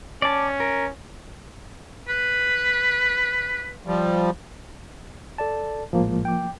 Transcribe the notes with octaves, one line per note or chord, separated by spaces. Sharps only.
C#4 D5 A5
A#4
B4
F3 G3
A4 D5 A5
A#1 A2 F3 G#3 A#3
G5 D6